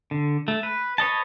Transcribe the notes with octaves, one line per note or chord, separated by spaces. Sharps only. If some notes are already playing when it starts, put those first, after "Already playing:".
D3
A3
B4
B4 C#5 D#5 A5